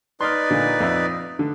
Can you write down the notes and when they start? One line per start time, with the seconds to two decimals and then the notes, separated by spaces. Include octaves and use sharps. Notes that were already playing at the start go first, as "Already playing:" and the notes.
0.21 D#4 B4 D5 C6 F6
0.50 A#2 D3
0.80 F2 E5
1.39 D3